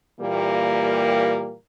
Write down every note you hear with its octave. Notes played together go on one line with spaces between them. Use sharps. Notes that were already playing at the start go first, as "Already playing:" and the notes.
A#2 E3 G3 A#3 G4 A#4